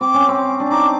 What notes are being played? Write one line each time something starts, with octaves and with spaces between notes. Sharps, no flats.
C4 D6
C#4
C4
D4
D#4 D6